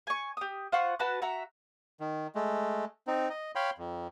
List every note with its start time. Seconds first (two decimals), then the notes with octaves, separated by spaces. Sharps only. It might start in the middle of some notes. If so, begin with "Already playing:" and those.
0.07 G#5 C#6
0.37 G4 D#6
0.72 F4 C5 F#5 C#6
0.99 F#4 B4 A5 F#6
1.22 F#4 E5 F#5 A#5
2.00 D#3
2.35 G#3 A3
3.07 C4 D#4
3.30 D#5
3.55 C#5 F5 G5 B5 C6
3.78 F2